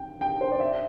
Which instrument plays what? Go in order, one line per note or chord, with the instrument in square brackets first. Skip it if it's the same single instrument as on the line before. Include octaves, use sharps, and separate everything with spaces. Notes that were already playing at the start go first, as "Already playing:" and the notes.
Already playing: [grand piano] G5
G5
C5
D5
E5